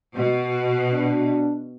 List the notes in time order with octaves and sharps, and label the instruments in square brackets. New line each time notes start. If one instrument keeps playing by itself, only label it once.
[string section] B2
[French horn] D4